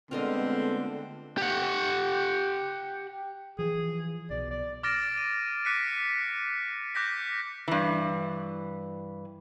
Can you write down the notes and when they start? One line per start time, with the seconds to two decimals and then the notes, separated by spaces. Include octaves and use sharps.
0.11 D3 G#3 A3 B3 C4 F4 A#4 D#5
1.38 G4 F#5
3.59 E3 F3 G#4
4.30 B1 B2 D5
4.51 D5
4.83 D6 F6 A6 A#6 D7 E7
5.18 D#7
5.65 D6 F#6 B6 C#7 D#7
6.94 D6 F#6 G6 A#6 B6 C#7
7.68 G2 E3